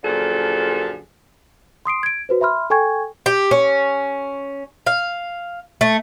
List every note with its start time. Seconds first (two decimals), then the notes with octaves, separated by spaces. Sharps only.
0.04 F#2 A#2 D3 F3 G#4 A4
1.86 C6 D#6 C7 D7
2.03 G#6 D7
2.29 F#4 B4 C5
2.41 E5 B5 C6 F6
2.70 A4 G5 G#5 C#6 G#6
3.26 G4
3.51 C#4
4.86 F5
5.81 A3